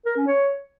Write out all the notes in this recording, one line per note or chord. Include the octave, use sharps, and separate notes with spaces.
A#4
C#4
C#5